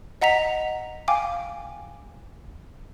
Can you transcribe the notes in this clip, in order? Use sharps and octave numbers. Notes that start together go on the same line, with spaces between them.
D#5 F#5 A#5 B6 F7
F5 G5 G#5 D6